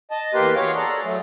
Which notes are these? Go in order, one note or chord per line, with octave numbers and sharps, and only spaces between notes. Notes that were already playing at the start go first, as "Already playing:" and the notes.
D#5 A5
E2 A#3 G4 A#4 B4 C6
F#4 G#4 C#5 F5 C6 D6
G#4 A4 D5 A#5
F#3 A3